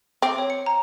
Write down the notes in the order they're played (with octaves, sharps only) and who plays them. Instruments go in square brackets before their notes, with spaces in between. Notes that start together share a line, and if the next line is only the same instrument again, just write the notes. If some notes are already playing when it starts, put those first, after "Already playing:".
[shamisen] C4 [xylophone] D6
[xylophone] C#5
C#7
A#5